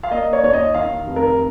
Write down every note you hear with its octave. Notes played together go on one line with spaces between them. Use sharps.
F5
A#3 D#5
C#5
D#2 C#5
D#5
D#3 F5
F1
A#4